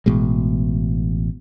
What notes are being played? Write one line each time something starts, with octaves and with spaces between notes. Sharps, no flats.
A1 B2 G#3